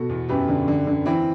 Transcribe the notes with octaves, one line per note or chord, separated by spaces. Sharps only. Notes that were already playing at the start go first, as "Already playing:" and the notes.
Already playing: B2 F#4 A4
E2
F#2 G4 B4
D3
D3
D3
E3 C4 E4